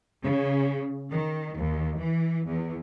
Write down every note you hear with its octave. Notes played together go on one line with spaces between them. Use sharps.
C#3
D#3
D#2
E3
E2